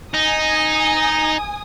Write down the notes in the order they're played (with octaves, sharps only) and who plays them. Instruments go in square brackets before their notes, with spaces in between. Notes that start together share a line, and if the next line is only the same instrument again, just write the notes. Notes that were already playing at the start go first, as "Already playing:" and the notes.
[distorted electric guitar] D#4 [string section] G#5 D#6